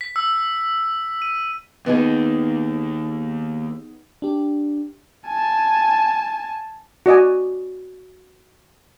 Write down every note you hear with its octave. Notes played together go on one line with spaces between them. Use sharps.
B6
E6
D#7
D#2 B3 D#4 G#4
D4 G4
G#5 A5
F#4 D5 D#5 G#5